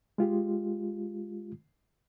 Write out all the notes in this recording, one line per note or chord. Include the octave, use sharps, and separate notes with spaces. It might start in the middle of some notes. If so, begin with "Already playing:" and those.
G#3 F4 G4